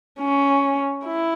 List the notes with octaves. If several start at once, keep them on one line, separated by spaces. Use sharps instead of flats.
C#4
E4